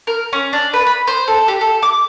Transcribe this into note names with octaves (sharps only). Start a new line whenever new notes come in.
A#4
C#4
D4
B4
B5
C5
A4
G4
A4
D6